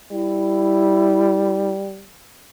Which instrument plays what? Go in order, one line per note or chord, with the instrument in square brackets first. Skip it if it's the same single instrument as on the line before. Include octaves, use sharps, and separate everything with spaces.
[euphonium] G3 [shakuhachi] E4